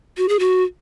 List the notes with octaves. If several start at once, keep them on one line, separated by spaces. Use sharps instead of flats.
F#4
G#4
F#4